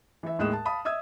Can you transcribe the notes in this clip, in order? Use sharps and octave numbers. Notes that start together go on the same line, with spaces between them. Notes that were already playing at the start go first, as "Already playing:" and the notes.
E3 E5
D#2 A2 G#3 D#6 F#6 E7
A5
F5 A5 B5 D#6
D#5 E5 D#6 E6 G#6